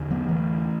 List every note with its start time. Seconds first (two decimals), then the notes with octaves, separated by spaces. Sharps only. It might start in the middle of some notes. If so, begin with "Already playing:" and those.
Already playing: E2 D3
0.11 F#3 B3
0.29 E3 A3